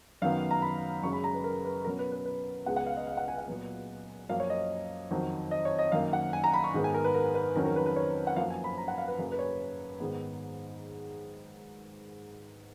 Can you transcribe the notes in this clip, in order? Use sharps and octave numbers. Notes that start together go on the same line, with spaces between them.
F#2 D#3 F#3 B3 F5
A#5
B5
F#2 C#3 G#3 C#4 C#6
B5
A#5
B4
A#4
B4
B2 F#3 C#4 A#4
B4
B4
B4
C#2 C#3 G#3 B3 F#5
F#5
F5
D#5
F5
F#5
G#5
F#5
A#2 F#3 B3
F#2 F3 A#3 C#4 F5
C#5
D#5
F2 D#3 F#3
D#5
C#5
D#5
F#2 D#3 A#3 F5
F#5
G#5
A#5
B5
C#6
G#2 D#3 G#3 B3
G#5
A#4
B4
A#4
B4
F2 D#3 F#3 C#4 A#4
A#4
B4
B4
C#5
F#5
F#2 F3 A#3 F5
G#5
B5
A#5
F#5
F5
B4
F#2 C#3 F#3 A#3
B4
C#5
G#2 D#3 G#3 B3